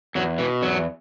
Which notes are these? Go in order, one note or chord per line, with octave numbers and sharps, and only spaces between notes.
E2 F#3
B2 E3
E2 F#3